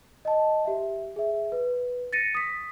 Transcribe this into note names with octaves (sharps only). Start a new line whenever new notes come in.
D#5 A5
G4 E5
G#4 E5
B4
A6 A#6 C#7 D#7
D#6 B6